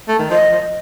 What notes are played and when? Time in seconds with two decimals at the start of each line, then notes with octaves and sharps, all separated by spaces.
0.08 A3
0.19 D#3
0.30 F3 D#5
0.51 F3